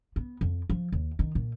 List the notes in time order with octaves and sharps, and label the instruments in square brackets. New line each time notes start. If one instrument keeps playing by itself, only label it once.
[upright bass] B3
F2
F3
D#2
D#3
A#2